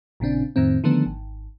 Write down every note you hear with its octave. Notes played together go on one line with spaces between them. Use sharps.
A1 A#2 C#3 C4 D4
F2 A2 D#3 C4
D3 D#3 F3 A3 B3 D4
G#1